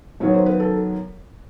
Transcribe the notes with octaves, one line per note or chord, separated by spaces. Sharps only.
F#2 D#3 F#3 B3 C#5
C5
B4
A4